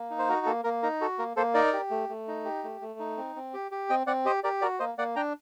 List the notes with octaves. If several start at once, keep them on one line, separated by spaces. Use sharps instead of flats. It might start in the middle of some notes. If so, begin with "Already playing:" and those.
Already playing: A#3
D#4
C5
F#4 A#4
A#3 A4
A#3 A#4
D#4 A#4
F#4 A4
A#3 A#4
A#3 A4 C5
D#4 A#4 D5
G4
A3
A3
D#4
G4
A3
A3
D#4
C4
C4
G4
G4
C4 D#5 G5
C4 D5 F#5
G4 C5 D#5
G4 A#4 D5
F#4 A#4 D5
A#3 C5 D#5
A#3 D5 F#5
D4 G5 A#5